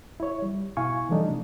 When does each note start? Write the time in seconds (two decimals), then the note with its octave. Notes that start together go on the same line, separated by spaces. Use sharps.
0.20 E4 C#5
0.42 G3
0.77 B2 E4 F5 G#5 C#6
1.09 E3 F3 G3 A3 D4 D#4
1.28 C3